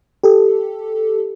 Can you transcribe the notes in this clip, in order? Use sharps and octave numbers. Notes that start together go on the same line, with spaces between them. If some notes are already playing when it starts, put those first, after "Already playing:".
G4 A4